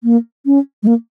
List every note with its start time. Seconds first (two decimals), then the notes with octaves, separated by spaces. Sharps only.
0.04 A#3
0.46 C#4
0.83 G#3
0.87 A#3